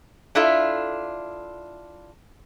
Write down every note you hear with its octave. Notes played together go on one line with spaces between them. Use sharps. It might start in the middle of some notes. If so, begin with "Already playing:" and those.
D4 E4 F4 A4 E5